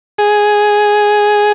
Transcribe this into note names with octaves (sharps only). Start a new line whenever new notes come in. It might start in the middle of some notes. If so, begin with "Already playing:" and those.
G#4